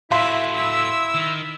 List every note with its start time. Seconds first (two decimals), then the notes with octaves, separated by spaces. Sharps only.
0.11 A2 E4 F#4 E5 F5 C6 B6
0.55 E4 E6
1.15 D#3